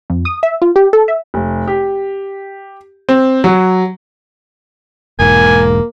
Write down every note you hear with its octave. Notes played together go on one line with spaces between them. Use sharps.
F2
D#6
E5
F4
G4
A4
E5
F1
G4
C4
F#3
E1 G#2 A#3 G#5